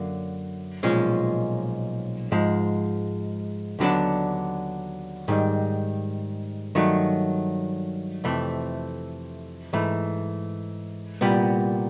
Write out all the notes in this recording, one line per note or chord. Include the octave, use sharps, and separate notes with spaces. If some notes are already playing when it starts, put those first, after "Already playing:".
Already playing: F#2 D3 F#3 A#3
B1 A#2 F3 G#3 C#4
G#2 F3 G#3
D#2 D3 F#3 B3 D4
G#2 D#3 G3
G2 D#3 F#3 A3
F2 C3 E3 A3
G#2 E3 A3
C2 A#2 G3 B3